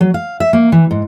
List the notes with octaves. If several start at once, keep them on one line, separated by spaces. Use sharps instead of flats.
F#3
F5
E5
A#3
E3
G#2